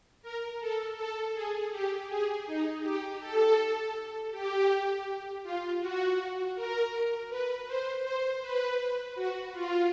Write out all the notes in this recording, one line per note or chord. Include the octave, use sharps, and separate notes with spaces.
A#4
A4
A4
G#4
G4
G#4
D#4
G4
A4
G4
F4
F#4
A#4
B4
C5
C5
B4
F#4
F4